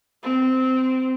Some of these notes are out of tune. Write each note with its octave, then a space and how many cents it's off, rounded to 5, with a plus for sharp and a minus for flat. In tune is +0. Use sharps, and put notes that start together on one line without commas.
C4 -15